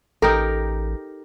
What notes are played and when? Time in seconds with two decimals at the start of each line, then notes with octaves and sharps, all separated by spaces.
0.22 A1 D#4 G4 A4 A#4